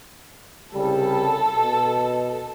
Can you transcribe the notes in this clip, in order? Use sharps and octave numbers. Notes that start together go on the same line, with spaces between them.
C2 C#3 G3 A4
B2